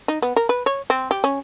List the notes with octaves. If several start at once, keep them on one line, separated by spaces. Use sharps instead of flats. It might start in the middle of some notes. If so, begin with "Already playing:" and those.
D#4
B3
A#4
B4
C#5
C4
G4
C#4